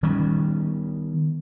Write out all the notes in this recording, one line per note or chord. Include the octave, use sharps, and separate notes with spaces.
D#3 G3 B3 C#4